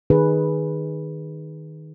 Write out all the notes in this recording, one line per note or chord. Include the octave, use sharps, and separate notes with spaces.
D#3 D#4 G#4 B4